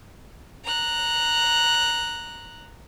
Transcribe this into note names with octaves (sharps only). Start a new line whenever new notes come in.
A#5 F#6